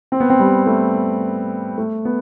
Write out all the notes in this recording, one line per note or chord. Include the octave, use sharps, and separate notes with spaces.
C4
B3
C4
G3
A3
A3
B3